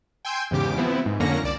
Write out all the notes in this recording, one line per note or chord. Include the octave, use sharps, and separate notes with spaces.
G5 G#5 C6 E6 G6
E2 G#2 C#3 G4 D6
F3 B3 C4 E4
G#2
F2 D3 A#3 C#4 A#6 C#7
C2 D5 E7